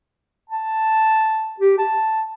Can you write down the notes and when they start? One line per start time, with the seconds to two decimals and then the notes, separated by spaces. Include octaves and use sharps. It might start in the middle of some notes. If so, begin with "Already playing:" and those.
0.50 A5
1.60 G4
1.78 A5